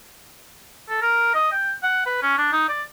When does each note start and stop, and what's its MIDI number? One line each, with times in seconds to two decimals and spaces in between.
0.89 1.01 69
1.02 1.33 70
1.34 1.50 75
1.52 1.73 79
1.83 2.03 78
2.06 2.17 71
2.22 2.34 61
2.38 2.52 62
2.52 2.66 63
2.69 2.83 74